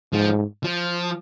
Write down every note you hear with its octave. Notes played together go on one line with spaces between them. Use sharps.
G#2 F3
F3